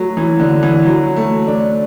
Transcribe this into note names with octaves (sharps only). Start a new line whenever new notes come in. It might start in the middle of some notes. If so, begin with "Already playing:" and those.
Already playing: F#3 A3
E3
D3
E3
F#3
A3
D4